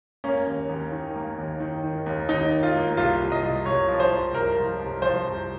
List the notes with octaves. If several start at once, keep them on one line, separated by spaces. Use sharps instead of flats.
A#3 C#4
D#2
D#2
D#3
A#3
D#2
D#3
D#3
D#2
D#2 D#4
D#3
F4
A#3
C2 F4
C2
D#5
C2
C2 C#5
F3
C5
C2
C2 A#4
F3
C2
F3 C5
C2